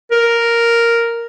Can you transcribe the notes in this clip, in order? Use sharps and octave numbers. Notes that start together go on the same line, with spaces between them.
A#4